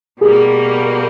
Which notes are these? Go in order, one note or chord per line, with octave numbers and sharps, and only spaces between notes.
B2 G3 A#3 G#4